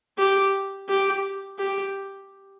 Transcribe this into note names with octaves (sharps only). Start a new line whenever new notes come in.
G4
G4
G4